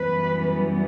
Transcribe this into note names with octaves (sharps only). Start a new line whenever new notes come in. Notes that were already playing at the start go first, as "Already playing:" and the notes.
Already playing: F#2 E3 G3 B3 B4